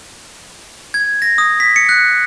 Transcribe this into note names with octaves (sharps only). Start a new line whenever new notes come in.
G#6
A#6
D#6
B6
C#7
F#6